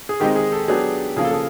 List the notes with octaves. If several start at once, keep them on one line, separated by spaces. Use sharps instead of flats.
G#4
D#3 G#3 C4 D#4 G4
G#4
A4
F#3 B3 D4 G4 G#4
C#3 F3 A#3 G#4
A4
G#4